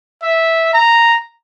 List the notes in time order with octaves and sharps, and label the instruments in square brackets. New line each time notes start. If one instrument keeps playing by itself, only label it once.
[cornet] E5
A#5